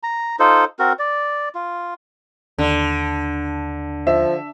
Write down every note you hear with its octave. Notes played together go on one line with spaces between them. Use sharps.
A#5
D#4 F4 A4 C5
C4 F#4 A#4
D5
F4
D#2 D3
F3 E5